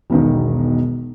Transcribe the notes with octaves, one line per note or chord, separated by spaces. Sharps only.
E1 B1 D#3